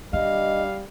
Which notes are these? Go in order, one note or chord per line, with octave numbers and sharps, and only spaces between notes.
G3 D4 D#5 F5